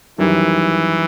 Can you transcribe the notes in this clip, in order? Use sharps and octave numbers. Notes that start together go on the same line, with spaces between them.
F#2 D#3 E3 G3